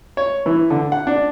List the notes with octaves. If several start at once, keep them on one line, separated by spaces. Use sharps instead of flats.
C#5
E3
D3
F#5
D4